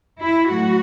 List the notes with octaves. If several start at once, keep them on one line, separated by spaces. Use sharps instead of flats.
E4
A2 F#3 A3 F#4